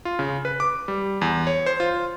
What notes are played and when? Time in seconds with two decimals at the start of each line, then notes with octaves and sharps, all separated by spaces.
0.05 F4
0.19 C#3
0.45 B4
0.60 D6
0.88 G3
1.21 E2
1.47 C#5
1.66 C5
1.80 F4